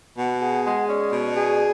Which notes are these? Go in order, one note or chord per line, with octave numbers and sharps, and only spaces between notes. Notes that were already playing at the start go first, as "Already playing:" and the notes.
B2 F#5
G#4 F#5
G#3 F#5
C#4 D5
B2
G#4